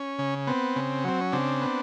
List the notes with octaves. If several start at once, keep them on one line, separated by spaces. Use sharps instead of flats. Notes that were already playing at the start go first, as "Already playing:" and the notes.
Already playing: C#4
C#3
B3 C4
C#3
F#3 C4
C#4
C#3 C4 D4
B3